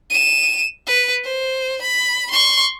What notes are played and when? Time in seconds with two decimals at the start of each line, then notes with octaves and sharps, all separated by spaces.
0.10 D#7 E7
0.87 B4
1.24 C5
1.82 B5
2.31 C6 C#6